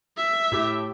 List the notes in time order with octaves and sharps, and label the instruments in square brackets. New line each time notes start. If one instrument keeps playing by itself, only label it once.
[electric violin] E5
[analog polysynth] A2 G4